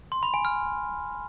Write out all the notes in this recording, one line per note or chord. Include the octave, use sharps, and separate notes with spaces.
C6
B5
G#5
F6